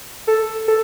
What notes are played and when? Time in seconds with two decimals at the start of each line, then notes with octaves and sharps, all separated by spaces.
0.28 A4
0.68 A4